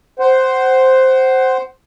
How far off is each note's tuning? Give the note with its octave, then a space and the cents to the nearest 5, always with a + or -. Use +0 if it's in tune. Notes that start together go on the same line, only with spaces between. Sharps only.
C5 +0 F#5 +25